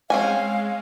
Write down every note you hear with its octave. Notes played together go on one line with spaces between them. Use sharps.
G#3 C4 C#4 F5 G#5